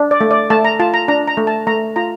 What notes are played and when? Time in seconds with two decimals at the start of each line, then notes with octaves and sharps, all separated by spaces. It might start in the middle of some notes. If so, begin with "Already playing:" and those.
Already playing: D4
0.11 D5
0.21 A3
0.31 D5
0.50 A3 A5
0.65 A#5
0.80 F4 A5
0.94 A#5
1.08 D4 A#5
1.28 A#5
1.37 A3
1.47 A5
1.67 A3 A#5
1.96 F4 A#5